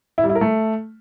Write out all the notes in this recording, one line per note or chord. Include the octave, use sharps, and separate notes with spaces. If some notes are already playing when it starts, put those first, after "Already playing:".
E4
G3
E4
A#4
A3